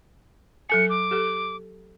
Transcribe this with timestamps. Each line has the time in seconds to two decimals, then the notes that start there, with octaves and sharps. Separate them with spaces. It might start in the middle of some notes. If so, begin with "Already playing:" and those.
0.70 F#3 A4 G#5 C#7
0.90 D6
1.11 G4 A4